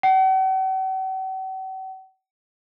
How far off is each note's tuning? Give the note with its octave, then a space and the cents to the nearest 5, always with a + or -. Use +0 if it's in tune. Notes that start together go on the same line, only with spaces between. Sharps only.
F#5 +45